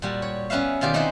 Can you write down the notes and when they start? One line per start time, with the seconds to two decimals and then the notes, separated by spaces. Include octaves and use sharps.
0.02 A#2 G3 F#4
0.22 C#5
0.50 B3 C#4 B4 E5 F5
0.81 B2 D#3 F4 G4 D5
0.94 C4 D#4 E4 B4 C5 G#5